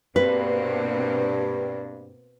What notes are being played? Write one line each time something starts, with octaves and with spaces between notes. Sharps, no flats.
G2 B2 A#3 C4 B4